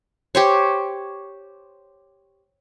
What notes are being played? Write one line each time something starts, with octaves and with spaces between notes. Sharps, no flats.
G4 C5 C#5